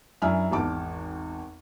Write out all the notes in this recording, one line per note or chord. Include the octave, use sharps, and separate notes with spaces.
F#2 D4 E4 G#5 F6
G#1 E2 A5 D6